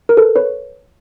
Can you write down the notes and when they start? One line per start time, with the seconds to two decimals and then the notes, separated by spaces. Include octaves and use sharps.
0.09 A#4
0.17 A4 B4
0.36 B4 C#5